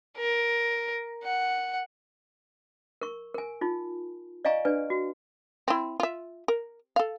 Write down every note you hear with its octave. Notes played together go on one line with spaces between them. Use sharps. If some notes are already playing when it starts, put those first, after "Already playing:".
A#4
F#5
A#4 C#6
A#4 G#5
D#4 F4
D5 D#5 F5 G#5 A#5 C#6
D4 B4 D5 G#5
F#4
C4 E4
F4 E5
A#4
A4 F5